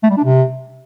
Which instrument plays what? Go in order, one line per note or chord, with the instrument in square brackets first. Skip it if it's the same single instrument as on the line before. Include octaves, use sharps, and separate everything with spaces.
[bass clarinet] A3
G3
D4
C3